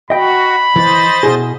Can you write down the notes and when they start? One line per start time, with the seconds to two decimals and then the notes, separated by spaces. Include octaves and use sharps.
0.10 F#4 D#5 G5 B5
0.76 E3 C5 D#5 A6
1.23 B2 E4 G#4